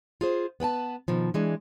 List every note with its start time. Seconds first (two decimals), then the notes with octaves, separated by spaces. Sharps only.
0.21 F4 G#4 C5
0.60 B3 B4 G5 A5
1.08 B2 D#3 F3
1.34 E3 G#3 D4